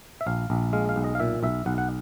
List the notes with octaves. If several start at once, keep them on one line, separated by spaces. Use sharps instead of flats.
E5
A#1 F5
A#1
G#3 F5
F5
B1
D#5
F5
A#2 E5
B1 E5
B1 F#5
F#5